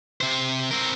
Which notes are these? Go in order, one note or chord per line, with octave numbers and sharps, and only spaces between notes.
C3 C5
C4 A#4